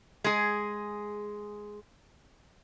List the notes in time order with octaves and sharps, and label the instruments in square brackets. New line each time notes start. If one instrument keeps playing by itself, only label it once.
[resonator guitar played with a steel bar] G#3 G#4